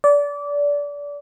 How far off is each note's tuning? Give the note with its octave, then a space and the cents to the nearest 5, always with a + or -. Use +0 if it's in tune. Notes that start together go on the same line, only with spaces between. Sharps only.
D5 -25